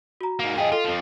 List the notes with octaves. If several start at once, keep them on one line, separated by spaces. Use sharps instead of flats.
F#4 A#5
G#2 A#3
F2 G#4 D#5 F5 G5
F4 A4 F5
F2 F3